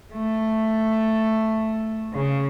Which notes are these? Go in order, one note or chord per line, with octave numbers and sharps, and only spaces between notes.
A3
C#3